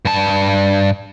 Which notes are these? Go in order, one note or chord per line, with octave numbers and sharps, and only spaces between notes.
G2 A5